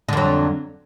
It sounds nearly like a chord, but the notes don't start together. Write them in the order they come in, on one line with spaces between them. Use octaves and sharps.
D3 F2 F#3